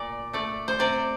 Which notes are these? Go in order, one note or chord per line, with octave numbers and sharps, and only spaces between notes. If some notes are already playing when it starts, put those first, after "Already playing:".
Already playing: A#2 D5
A3 D5
C5
C3 D5